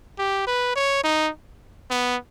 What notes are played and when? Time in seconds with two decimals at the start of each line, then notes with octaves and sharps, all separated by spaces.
0.18 G4
0.47 B4
0.76 C#5
1.04 D#4
1.91 B3